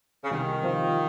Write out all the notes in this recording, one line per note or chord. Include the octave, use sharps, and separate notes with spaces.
C#3
C2 D#3
C3 F3 C4 F4